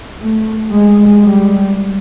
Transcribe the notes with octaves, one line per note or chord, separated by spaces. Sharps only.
A3
G#3
G3